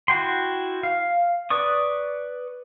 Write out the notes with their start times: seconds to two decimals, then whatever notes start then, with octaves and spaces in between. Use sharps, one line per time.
0.08 E4 F#4 G5 C6
0.83 F5
1.50 B4 D5 C#6 D#6